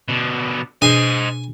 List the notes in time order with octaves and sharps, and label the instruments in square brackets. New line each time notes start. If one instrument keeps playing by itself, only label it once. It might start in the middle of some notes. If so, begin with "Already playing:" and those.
[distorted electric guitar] B2 D3
[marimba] B2 D4 G#4 [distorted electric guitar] C5 D#5 [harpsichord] G#5